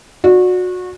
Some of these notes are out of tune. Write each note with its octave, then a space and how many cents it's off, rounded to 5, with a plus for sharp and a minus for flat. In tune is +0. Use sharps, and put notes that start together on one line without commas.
F#4 -25 D5 +0